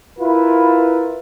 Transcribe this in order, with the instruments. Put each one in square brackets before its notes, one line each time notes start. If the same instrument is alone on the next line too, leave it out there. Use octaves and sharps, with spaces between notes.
[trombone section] E4 F4 A#4 B4